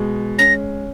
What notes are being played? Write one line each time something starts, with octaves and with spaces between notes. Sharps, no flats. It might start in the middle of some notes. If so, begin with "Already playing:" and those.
Already playing: B2 G#3
C#4 A#6